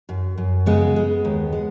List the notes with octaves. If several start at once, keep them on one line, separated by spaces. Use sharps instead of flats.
F#2
F#2
C#3 G#3 B3
G#3
D#2
G#3